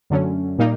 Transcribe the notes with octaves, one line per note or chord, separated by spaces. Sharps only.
F#2 D3 F#3 A3 C#4
A#2 G3 A#3 D#4